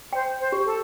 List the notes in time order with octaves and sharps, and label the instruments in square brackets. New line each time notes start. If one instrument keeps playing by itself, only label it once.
[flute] C5 [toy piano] G5
[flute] C5
[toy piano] G4
[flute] A4